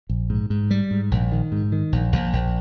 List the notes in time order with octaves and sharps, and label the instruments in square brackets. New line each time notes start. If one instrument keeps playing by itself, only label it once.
[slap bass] A#1
G#2
G#2
G3
G#2
A#1
D#3
G#2
D#3
A#1
A#1
A#1